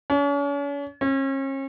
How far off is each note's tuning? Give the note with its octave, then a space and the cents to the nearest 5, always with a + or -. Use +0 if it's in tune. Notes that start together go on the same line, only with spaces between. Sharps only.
C#4 +40
C#4 -40